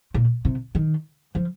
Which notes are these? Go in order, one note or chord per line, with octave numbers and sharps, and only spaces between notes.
A#2
C3
D#3
F3